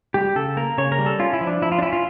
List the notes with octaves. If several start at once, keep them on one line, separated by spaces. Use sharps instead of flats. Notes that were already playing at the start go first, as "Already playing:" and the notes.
G3 G4
C#3 A4
A#3 A#4
C#3 C#5
A#4
G3
A4
C#4 F4
E4
F3
D4
F3 E4
F4
D4
C#4 E4
F4